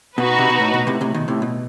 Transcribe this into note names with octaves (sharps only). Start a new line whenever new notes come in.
B2 D#4 F#4 B4
C3
B2
A2
B2
A2 C3
A2 C3
B2 D#3
A2 C3
B2